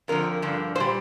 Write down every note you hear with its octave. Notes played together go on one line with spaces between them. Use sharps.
F2 D3 F3 A#4
G2 D3 F3
A#2 G3 C5